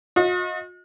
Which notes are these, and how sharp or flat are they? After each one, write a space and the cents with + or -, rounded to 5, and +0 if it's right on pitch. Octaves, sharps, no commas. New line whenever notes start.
F#4 -45 D#5 +20